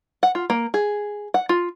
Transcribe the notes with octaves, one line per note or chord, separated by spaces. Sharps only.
F#5
F4
A#3
G#4
F#5
F4